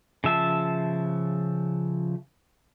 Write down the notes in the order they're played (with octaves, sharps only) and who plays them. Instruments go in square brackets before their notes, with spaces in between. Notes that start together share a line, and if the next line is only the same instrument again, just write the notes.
[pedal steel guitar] C#3 F3 E5 A5